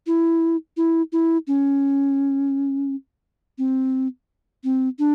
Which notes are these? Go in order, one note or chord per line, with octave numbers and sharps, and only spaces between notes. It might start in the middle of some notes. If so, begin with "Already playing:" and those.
E4
E4
E4
C#4
C4
C4
D4